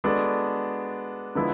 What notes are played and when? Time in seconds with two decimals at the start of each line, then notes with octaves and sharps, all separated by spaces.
0.04 G#3 B3 D4 F#4 A4
1.35 D3 F3 G#3 B3 E4